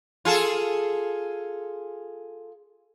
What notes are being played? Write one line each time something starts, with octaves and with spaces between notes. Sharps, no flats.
F4 G#4 A4